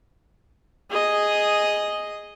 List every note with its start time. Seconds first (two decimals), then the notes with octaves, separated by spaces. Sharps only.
0.90 G#4 D#5